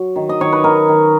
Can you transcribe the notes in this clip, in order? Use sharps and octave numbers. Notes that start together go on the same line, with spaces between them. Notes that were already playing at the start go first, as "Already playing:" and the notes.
Already playing: F#3
D#3
D#5
D#3 C#5
B4
D#3 A#4
D#3